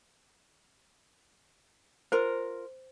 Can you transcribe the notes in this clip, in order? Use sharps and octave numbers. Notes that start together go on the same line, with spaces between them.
F4 A#4 C5